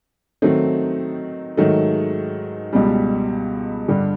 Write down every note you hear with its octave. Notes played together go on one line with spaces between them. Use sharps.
D#3 F#3 A3 C4 D#4
G#2 D#3 F#3 A3
C#2 B2 G3
G2 D3 G3